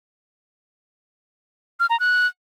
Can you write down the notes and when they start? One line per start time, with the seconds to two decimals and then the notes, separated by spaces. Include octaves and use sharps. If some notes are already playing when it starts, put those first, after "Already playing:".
1.80 F6
1.90 A#5
2.00 F#6